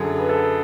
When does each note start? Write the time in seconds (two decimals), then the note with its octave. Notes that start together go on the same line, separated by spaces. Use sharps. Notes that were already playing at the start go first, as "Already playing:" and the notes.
Already playing: F#2 D3 F#3 G#4
0.18 B4
0.29 A4